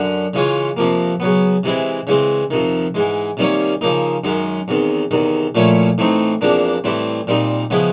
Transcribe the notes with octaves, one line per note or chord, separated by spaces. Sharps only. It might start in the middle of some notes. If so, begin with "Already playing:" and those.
Already playing: F#2 D3
C#3 E3 G#3 C#4 F4
F2 C3 F3 A#3
C#3 F#3 B3
C3 E3 G#3 C4 E4
C#3 E3 G#3 C4
F2 C3 D#3
G#2 E3 G#3
C3 D#3 G3 A#3 C#4
C#3 F3 A#3 D#4
F#2 D#3 G#3
E2 C3 D#3
E2 C3 D#3
A#2 F3 A3 C#4 E4
A2 E3 A3 C4 D#4
E2 C3 F3 A#3 D4
A2 E3 G3 C4 E4
A#2 G3 C4 D#4
C#3 F3 G#3 B3 E4